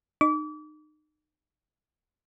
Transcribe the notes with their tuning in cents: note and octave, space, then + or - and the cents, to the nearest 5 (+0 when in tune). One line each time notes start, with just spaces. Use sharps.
D#4 -30 D6 -35